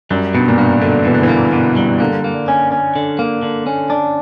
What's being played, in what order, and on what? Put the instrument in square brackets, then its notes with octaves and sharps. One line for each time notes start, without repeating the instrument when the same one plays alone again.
[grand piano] F#2 [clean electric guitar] G3
[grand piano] G2 [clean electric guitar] B2
[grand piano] A#2
[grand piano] G2 [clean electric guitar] A#3
[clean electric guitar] B2 [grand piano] D3
[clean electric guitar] B2 [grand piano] E3
[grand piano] D3
E3
[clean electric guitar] A#3
B2
G3
[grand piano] D3 [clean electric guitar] A#3
[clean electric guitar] A#3
C#4
C#4
D3
A#3
D3
C#4
D4